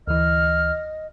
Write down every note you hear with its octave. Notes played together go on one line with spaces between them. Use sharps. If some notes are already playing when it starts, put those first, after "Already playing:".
D2 E3 D#5 F6